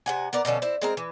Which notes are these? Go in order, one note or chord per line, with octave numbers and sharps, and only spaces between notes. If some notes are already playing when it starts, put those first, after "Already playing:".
C3 F#5 G#5
B3 A#4 D5
B2 D3 F3 C#4
C4 E4
G#3 C4 A#4
E3